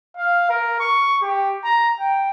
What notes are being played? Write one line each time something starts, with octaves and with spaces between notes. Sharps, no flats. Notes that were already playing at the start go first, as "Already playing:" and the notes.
F5
A#4
C#6
G4
A#5
G5